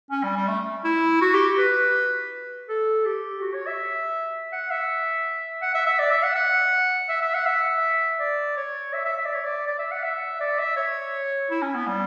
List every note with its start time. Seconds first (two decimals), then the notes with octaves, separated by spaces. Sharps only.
0.11 C#4
0.23 G3
0.36 G3
0.48 A3
0.84 E4
1.21 F#4
1.34 G4
1.58 B4
2.69 A4
3.05 G4
3.42 F#4
3.54 C#5
3.67 E5
4.52 F#5
4.71 E5
5.62 F#5
5.75 E5
5.87 E5
5.99 D5
6.11 E5
6.23 F#5
6.35 F#5
7.09 E5
7.22 E5
7.34 F#5
7.46 E5
8.20 D5
8.57 C#5
8.93 E5
9.05 E5
9.18 E5
9.26 D5
9.35 C#5
9.44 D5
9.67 D5
9.79 E5
9.91 F#5
10.04 E5
10.41 D5
10.59 E5
10.77 C#5
11.51 E4
11.62 C#4
11.74 B3
11.87 G3